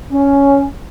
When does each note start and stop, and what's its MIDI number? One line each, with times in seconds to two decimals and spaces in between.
0.12 0.65 61